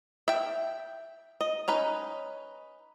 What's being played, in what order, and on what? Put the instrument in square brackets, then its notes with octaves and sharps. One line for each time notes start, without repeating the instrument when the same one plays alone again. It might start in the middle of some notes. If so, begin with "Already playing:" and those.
[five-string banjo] E5 G5
D#5
C#4 D#4 B4